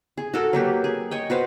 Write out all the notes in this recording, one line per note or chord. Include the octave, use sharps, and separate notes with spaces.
G#4
F#4 A4 A#4
F#3 A#3 G4 B4
G#4
C#5 D#5 G5
F#4 B4 C5 F5